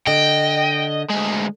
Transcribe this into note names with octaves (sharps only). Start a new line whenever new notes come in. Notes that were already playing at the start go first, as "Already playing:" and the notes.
D3 D#5 G5
D2 G#3